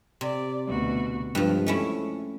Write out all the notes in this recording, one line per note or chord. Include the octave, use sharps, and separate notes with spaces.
C3 D5
D2 B2 F#4
G2 F3 G#3
A3 C#4 E4